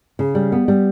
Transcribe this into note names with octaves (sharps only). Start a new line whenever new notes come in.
C#3
G3
B3
G3